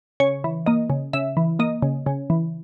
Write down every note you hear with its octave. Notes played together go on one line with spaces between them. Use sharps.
C#3 C#5
E3
A#3 D#5
C#3
C#3 E5
E3
A#3 D#5
C#3
C#3
E3